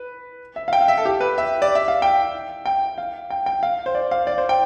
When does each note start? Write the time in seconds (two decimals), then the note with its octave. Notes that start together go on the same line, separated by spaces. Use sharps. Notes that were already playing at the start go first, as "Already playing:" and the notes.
Already playing: B4
0.56 E5
0.68 F5
0.73 G5
0.81 F5
0.88 E5
0.97 A4
1.05 G4
1.20 B4
1.38 E5
1.62 D5
1.75 E5
1.88 F5
2.02 G5
2.66 G5
2.98 F5
3.30 G5
3.46 G5
3.63 F5
3.86 C5
3.95 D5
4.11 F5
4.27 D5
4.38 C5
4.49 G5